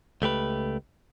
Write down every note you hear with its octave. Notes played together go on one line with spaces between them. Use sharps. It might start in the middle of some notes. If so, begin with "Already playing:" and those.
C#2 A3 G4 B4